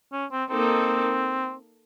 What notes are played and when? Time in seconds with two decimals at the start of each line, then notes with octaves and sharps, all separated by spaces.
0.12 C#4
0.31 C4
0.49 A#3 C4 D#4 A4